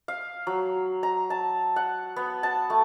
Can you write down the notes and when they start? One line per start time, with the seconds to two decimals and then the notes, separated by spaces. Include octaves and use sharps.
0.08 F5
0.47 F#3
1.03 A#5
1.30 A5
1.76 F#5
2.16 B3
2.43 A5
2.70 A3